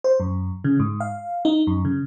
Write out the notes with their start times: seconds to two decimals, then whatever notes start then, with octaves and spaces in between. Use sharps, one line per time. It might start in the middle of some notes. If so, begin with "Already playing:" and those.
0.04 C5
0.20 F#2
0.64 C#3
0.80 G#2
1.00 F5
1.45 D#4
1.67 F#2
1.85 C#3